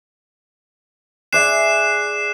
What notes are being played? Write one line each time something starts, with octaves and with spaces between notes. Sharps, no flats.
G#4 D5 E5 F#6 C7 E7